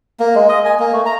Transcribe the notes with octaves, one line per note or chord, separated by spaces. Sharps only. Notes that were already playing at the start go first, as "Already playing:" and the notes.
A#3
G#3
D#5
G#5
A#3
A3
A#5